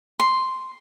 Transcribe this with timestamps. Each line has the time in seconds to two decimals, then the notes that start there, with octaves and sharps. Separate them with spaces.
0.20 C6